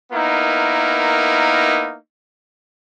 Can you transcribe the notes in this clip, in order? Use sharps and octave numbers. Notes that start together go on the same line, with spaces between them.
A#3 B3 D#4 E4 A#4